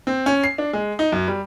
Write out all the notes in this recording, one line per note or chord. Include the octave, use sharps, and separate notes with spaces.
C4
C#4
C7
D4
G#3
D#4
F#2
G3